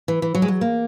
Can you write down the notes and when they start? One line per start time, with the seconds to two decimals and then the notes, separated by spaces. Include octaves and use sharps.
0.08 E3
0.22 E3
0.35 F#3
0.42 G#3
0.48 F#3
0.61 A#3